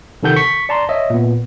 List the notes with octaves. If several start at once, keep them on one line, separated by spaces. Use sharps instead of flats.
C3 D#3 F3 A4 F#5 G6
C#6 B6
D5 A5 A#5 C6
C#5 D#5 E5
A#2 B3